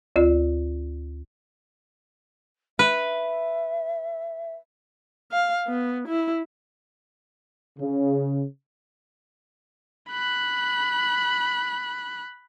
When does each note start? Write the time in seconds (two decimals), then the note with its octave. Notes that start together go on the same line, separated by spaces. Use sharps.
0.16 D2 F4 D5
2.79 B4 E5
5.32 F5
5.67 B3
6.08 E4
7.78 C#3
10.10 B5 F#6